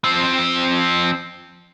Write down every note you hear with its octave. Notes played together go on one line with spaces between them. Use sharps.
F3 C4